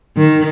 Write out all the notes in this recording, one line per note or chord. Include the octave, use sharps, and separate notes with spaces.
D#3